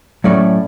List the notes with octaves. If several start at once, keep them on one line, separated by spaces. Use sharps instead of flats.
A2 F#3 A3 C#4 D5